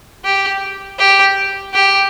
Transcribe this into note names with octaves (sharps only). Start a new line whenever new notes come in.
G4
G4
G4